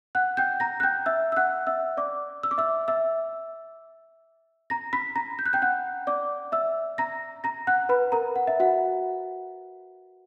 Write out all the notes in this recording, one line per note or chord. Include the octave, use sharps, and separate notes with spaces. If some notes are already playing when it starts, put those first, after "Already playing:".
F#5 F#6
G5 G6
A#5 A#6
F#6
G5 G6
E5 E6
E6
F#5 F#6
E5 E6
D5 D6
E6
D6
E5 E6
E5 E6
A#5 A#6
B5 B6
A#5 A#6
G6
F#6
G5 G6
F#5 F#6
D5 D6
E5 E6
A#5 A#6
A#5 A#6
F#5 F#6
B4 B5
A#4 A#5
F#5
E5
F#4 F#5